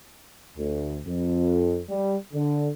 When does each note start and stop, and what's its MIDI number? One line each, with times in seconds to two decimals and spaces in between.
0.58 0.99 38
1.06 1.82 41
1.89 2.16 55
2.34 2.69 50